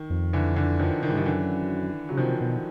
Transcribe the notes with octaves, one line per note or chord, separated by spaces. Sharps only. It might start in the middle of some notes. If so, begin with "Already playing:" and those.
Already playing: D#3
F2
D3 E3
D3 E3
D#3 F3
D#3
G#2 E3
G2 D#3
F#2 D3 E3
C#3 F#3
C3 D#3 F3
B2